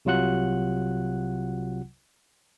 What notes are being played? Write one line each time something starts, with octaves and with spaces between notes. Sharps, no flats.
C2 C3 F#3 F4 F#5 F#6